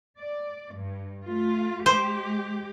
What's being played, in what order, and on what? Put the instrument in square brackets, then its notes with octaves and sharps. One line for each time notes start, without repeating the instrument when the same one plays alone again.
[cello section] D5
G2
A3 F4
[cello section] G#3 G4 [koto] C5